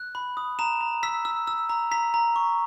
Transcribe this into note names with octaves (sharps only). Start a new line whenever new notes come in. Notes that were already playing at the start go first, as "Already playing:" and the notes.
Already playing: F#6
B5
D#6
A#5 E7
A#5
E6 B6
E6
E6
A#5
A#5 B6
A#5
C#6